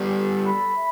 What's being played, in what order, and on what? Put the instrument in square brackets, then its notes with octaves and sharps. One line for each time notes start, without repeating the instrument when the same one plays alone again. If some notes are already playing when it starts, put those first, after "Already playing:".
Already playing: [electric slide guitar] G3 B3
[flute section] A4
B5
E5